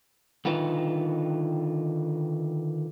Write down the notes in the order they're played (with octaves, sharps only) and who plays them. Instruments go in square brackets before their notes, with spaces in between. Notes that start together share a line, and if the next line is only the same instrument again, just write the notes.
[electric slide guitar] D3 D#3 D#4 F4 B4